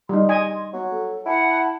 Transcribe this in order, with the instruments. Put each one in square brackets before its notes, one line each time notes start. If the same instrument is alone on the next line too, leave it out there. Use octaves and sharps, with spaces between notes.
[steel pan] G3 D#4 [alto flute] C6
[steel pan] D#5 G#5
[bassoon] F#3 [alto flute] B3
[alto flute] A4
[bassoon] E4 [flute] F#5 [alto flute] A5